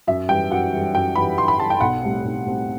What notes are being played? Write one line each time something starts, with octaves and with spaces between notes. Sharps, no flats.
F#2 E5
E3 G3 G5
F#2 F#5
E3 G3
F#2 G5
E3 G3 B5
F#2 C6
B5
E3 G3 A5
G5
B1 F#5
A2 G3 C4
B1
A2 G3 C4